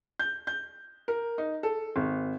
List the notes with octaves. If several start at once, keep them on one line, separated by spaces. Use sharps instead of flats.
G6
G6
A#4
D#4
A4
G#1